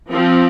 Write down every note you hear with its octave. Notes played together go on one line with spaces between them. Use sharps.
F3 C4